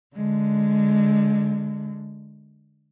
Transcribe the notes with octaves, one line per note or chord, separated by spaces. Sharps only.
D3 G#3